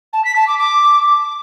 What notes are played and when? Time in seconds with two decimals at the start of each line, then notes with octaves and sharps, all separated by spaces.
0.13 A5
0.24 B6
0.36 A5
0.47 D6
0.58 D6